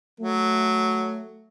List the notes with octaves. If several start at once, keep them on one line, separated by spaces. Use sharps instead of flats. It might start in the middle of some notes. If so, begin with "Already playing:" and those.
F#3 A3